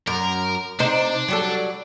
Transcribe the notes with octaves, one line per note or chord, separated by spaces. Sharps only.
F#2 A#4
C3 D4 D#4 C5
F#3 G3 A4